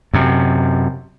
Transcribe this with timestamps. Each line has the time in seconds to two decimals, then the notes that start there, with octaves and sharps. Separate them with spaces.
0.14 F#2 C3